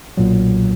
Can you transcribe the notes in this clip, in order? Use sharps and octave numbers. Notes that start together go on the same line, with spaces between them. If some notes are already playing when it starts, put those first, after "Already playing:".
B1 A#2 F#3